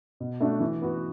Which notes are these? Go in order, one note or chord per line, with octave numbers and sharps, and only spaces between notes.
B2
A3 D4 F#4
E3
B3 F#4